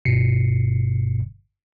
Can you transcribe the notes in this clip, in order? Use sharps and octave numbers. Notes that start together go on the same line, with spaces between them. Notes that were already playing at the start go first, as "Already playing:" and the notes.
G1 G2 B2 C7 C#7